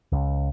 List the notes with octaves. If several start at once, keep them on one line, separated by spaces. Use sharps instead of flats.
C#2